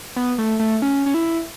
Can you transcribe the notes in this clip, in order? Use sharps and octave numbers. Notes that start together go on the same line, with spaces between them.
B3
A3
A3
C#4
C#4
E4